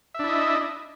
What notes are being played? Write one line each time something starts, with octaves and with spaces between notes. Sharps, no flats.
D4 E4 D#5 E5